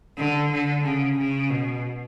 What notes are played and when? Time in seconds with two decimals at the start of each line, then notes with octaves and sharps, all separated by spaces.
0.18 D3
0.52 D3
0.84 C#3
1.18 C#3
1.50 B2